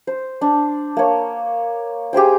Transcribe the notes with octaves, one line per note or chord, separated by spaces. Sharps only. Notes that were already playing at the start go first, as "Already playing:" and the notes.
C5
D4
A#3 C#5
G4 G#4 C5 G5